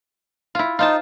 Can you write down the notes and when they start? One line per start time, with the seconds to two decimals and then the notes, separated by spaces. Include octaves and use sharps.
0.55 E4 F4
0.79 D#4 F4 C5 A5